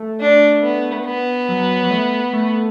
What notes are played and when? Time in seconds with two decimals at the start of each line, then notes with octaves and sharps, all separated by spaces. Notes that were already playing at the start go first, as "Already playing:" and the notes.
Already playing: A3
0.20 D4
0.63 B3
1.05 B3
1.49 F#3
1.84 F#3
1.90 A3
2.33 A3